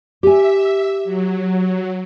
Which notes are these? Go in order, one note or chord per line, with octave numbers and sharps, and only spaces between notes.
G4 E5 G#5
F#3